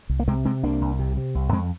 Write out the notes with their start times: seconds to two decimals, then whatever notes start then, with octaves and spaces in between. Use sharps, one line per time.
0.09 C2
0.20 A#3
0.28 C3 G#3 C4
0.45 C3 G#3 C4
0.63 C2 A#3 D4
0.81 C2
0.99 C3
1.17 C3
1.35 C2
1.52 F2 G#3 C4